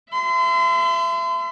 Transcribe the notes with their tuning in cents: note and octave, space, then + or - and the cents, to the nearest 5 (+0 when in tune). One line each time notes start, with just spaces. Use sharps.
E5 +25 C6 -40